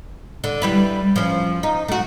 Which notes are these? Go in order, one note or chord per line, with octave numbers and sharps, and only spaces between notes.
D3
G3 E4 B4
F3 C#4
D#4
A3 F#4